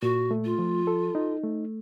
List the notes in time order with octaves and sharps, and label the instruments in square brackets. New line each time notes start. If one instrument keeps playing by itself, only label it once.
[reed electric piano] A#2 [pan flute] F#4
[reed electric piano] A3
[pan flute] F4
[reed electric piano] F3
A4
D#4
A3